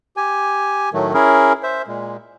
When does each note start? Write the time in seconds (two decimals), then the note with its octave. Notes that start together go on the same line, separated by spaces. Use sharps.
0.17 G4 G#5
0.93 A2 D#3 F#3 A3
1.14 C#4 E4 G#4 A#4
1.63 C5 E5
1.87 A#2 G#3